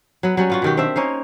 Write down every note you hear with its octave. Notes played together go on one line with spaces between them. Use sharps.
F#3 B3
F#3 G3 C#4
B3 F4 F#4
B2 D#3 G4
C4 D4 E5
A#3 C#4 D#4 C5